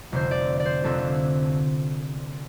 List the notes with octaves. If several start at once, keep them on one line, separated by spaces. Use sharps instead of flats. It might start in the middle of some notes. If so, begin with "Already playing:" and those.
F1 F2 D3 C5
D5
D5
C5
F1 F2 D3 A4